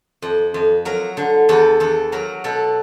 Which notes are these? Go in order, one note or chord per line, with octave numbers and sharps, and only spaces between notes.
F2
F2
F#3 A#4
D3
E2 A4
E2 A4
F#3 A#4
B2 A4